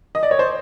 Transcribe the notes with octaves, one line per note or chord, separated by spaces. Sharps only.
D#5
D5
C#5
C5